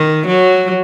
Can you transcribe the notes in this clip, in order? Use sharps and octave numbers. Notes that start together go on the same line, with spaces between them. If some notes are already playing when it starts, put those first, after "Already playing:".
Already playing: D#3
F#3